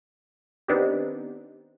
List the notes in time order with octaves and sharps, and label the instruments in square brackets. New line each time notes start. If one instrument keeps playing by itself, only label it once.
[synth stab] D#3 B3 C4 D4 D#4 G4